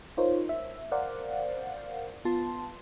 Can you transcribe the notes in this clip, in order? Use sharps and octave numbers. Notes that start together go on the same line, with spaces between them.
D#4 F4 A#4 C5 C#5
E5
A#4 C5 D5 F5 F#5
B3 F4 A5 C6